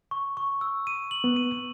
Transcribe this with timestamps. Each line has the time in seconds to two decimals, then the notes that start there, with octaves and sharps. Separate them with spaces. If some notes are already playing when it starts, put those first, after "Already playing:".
0.11 C#6
0.37 C#6
0.61 E6
0.87 D#7
1.11 F#7
1.24 B3
1.36 D#7